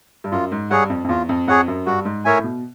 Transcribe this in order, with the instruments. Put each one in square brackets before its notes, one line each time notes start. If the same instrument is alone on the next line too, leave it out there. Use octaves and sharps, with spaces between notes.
[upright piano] G2
[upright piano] F#2 [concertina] F4
[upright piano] G#2
[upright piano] G2 [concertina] G#4 C#5 F#5
[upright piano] F2
F2
[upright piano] E2 [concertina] F4
[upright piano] F2
[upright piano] F2 [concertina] G#4 C#5 F#5
[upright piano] F#2
[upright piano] G2 [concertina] F#4
[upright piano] G#2
[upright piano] A2 [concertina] A#4 C#5 E5 G#5
[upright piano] B2